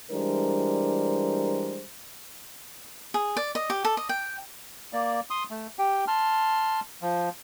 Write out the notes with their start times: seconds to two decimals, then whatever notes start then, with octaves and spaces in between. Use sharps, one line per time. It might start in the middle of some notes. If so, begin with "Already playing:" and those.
0.11 E3 G3 G#3 D4 A#4 C5
3.14 G#4
3.37 D5
3.55 D#5
3.70 G4
3.85 A4
3.97 D#5
4.09 G5
4.93 A#3 D5
5.30 C6 D#6
5.50 A3
5.79 G4 G5
6.08 A5 C6 F6
7.02 F3